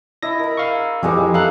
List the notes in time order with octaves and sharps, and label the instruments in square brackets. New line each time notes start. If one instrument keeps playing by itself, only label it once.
[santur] E4 D#5 [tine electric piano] A#6
[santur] A#4 B5
[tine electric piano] F5 C#6
[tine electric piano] F2 E3 [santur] G3 G#3 G4
[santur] A4 E5 A#5 [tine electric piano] F5 F#6